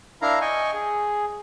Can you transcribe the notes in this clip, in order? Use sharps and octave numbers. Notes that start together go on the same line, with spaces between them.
D4 E4 A#4 F5 A#5
D#5 G5 G#5 C#6
G#4